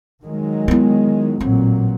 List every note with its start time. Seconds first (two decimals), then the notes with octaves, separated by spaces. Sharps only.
0.24 D#3 F#3 G#3
0.68 B3 E4
1.41 A1 A#2 F#3 C4